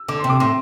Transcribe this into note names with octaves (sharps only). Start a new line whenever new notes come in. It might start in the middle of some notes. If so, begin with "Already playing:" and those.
Already playing: E6
D3 D6
C6
C3
D6
A2 C6